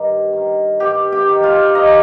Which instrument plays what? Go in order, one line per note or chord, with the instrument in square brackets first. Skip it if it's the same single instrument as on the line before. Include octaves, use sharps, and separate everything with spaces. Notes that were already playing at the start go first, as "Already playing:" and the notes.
Already playing: [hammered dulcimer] G2 D#3
D#3
G2 G4 G5
G4 G5
D#3
F4 F5
G2 D#4 D#5